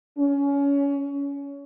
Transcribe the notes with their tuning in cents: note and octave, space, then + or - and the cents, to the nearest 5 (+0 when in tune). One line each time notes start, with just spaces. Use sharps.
C#4 +25